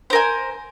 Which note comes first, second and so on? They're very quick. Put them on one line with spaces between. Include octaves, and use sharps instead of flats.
C5 A#4 G#5